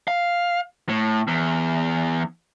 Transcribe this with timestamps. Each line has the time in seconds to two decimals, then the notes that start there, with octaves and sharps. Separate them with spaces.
0.08 F5
0.89 A2
1.28 E2